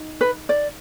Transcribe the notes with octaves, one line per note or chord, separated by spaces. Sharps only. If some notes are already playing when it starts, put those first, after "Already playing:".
Already playing: D#4
B4
D5